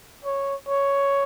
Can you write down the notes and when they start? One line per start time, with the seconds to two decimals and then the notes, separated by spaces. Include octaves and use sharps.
0.24 C#5
0.68 C#5